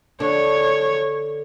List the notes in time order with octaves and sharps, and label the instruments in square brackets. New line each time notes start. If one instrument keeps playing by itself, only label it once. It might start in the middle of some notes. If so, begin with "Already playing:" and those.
[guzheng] D3 [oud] D4 [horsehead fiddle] C#5